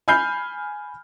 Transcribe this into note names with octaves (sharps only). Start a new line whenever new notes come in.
G#5 B5 F6 G6 C7